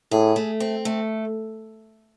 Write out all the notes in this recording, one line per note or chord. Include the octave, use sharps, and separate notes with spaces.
A2 G#4
A3
C4
A3